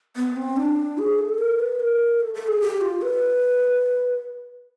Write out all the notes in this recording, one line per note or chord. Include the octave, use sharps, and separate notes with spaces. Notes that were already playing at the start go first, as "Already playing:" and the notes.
B3
C4
D4
G#4
A4
A#4
B4
A#4
A4
A4
G#4
G4
F4
B4